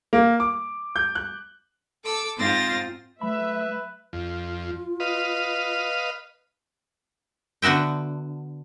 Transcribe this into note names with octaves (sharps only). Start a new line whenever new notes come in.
A#3
D6
G6
F#6
A4 D6 E6
G#2 C4 F4 C5 A6 A#6
F#3 A3 B4 E5 B5
F2 F4
B4 D#5 F5
D3 B3 F#4 E5 G5